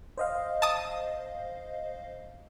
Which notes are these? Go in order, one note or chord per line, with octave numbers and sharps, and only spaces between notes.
C5 D#5 F5
A5 D#6